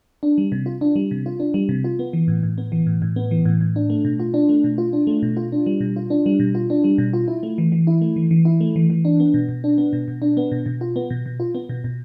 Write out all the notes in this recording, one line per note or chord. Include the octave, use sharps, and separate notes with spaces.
D4
G3
C3
F4
D4
G3
C3
F4
D4
G3
C3
F4
B3
E3
A2
A2
B3
E3
A2
A2
B3
E3
A2
A2
D4
A3
B2
F4
D4
A3
B2
F4
D4
A3
B2
F4
D4
G3
B2
F4
D4
G3
B2
F4
D4
G3
B2
F4
E4
A3
E3
E3
E4
A3
E3
E3
E4
A3
E3
E3
D4
B3
B2
B2
D4
B3
B2
B2
D4
B3
B2
B2
F4
B3
B2
B2
F4
B3
B2
B2